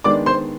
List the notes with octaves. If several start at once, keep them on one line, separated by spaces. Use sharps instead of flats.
D#3 G#3 B3 D4 D5 D6
C5 C6